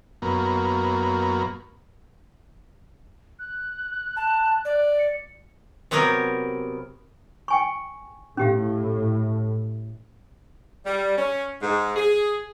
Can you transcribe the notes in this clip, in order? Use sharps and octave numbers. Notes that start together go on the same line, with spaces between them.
F#2 A#3 B3
F#6
A5
D5
C#7
C3 F#3 B3 G4 A#4 G#5
G5 G#5 C#6
A2 C#4 G4 F5
G3
C#4
G#2
G#4